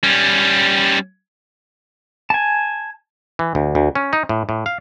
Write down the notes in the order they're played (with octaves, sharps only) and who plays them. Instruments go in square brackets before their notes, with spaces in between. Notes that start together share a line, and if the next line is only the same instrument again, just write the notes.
[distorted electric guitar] G3 C#4
[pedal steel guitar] G#5 A5
[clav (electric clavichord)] E3
D2
D2
C#4
D#4
A2
A2
F5